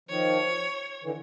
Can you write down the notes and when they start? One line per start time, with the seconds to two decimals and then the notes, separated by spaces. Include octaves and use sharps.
0.09 D#3 F3 C#5
1.04 D3 E3